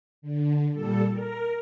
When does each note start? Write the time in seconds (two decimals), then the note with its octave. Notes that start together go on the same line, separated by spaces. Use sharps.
0.22 D3
0.72 A#2 G3 A4
1.12 A#4